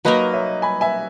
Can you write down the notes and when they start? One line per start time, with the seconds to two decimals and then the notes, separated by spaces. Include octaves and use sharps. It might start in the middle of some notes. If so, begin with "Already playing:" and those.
0.05 F#3 A#3 D#4 A#4 B4 D#5
0.33 C#5 E5
0.62 G#5 B5
0.81 E5 G#5